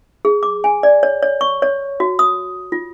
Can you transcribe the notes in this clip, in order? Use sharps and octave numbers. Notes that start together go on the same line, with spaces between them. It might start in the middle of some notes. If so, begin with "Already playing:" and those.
G#4
D6
G#5
D5
C#5
C#5
C#6
C#5
F#4
D#6
F4